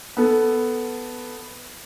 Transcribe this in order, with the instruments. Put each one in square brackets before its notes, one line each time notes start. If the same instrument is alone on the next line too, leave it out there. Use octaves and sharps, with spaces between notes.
[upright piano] B3 A4